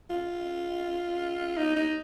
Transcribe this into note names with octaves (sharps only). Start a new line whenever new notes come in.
F4
D#4
D#4